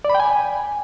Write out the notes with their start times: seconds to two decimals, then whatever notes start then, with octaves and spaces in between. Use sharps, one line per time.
0.05 D5
0.10 B5
0.15 G5
0.20 G#5